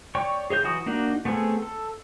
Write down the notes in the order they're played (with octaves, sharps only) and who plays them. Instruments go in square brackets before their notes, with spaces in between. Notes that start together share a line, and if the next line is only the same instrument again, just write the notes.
[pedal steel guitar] C#5 D5 G5 C#6
G#4 C#5 D#5 G6
E3 F#3 F#4 D#6
A#3 D4 D#4 F#4
A3 B3 C4 G#4 A4
A4